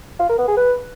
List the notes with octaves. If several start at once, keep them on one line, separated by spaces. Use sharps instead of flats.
F4
A#4
B3
G#4
B4